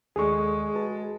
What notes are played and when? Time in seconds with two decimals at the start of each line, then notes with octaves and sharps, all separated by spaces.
0.16 D#2 G#3 G#4 A4 D5 C#6
0.75 F#4 B4 A5